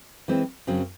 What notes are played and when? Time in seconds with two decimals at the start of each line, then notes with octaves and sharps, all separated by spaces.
0.28 E3 G#3 C4
0.67 F#2 C#3 F#3 C4